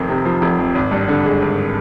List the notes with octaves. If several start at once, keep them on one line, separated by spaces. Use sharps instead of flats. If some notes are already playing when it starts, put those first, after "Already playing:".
Already playing: F1 F2 D#3
C3
F3
F1
F2
G#1
G2
D3
G#3
G#1